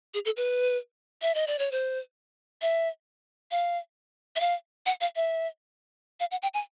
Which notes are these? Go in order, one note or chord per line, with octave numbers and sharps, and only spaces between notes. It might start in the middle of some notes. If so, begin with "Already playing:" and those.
G#4
A4
B4
E5
D#5
D5
C#5
C5
E5
F5
E5
F5
F#5
F5
E5
F5
F#5
G5
G#5